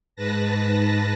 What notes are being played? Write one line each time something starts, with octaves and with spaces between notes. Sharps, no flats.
G#2 B4 A5 A#6